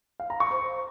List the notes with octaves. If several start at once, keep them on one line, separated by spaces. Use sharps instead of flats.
F5
A#5
C#6
C5